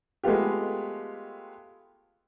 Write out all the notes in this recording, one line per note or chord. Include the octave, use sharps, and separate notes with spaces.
G#3 A3 B3 F4 G4